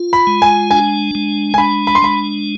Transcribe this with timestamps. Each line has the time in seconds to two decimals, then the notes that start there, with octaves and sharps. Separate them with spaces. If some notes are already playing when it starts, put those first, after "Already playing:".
Already playing: F4
0.13 B5
0.27 G#3
0.42 G#5
0.71 D4 G#5
1.15 G#3
1.54 G#5
1.58 D4 B5
1.87 B5
1.95 C6
2.02 G#3 B5